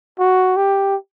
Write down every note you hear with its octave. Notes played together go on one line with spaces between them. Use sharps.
F#4
G4